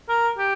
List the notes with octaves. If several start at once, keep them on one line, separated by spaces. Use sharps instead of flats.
A#4
G4